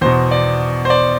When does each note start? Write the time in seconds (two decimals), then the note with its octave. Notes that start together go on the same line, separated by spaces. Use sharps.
0.01 E2 B2 C5
0.31 D5
0.85 C5
0.90 D5